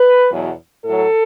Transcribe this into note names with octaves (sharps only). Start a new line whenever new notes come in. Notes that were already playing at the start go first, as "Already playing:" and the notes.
Already playing: B4
E2 B2 F#3
A2 F#3 A4